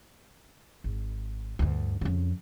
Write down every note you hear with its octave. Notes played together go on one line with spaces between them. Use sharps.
G#1
D2 G2
F2 C#3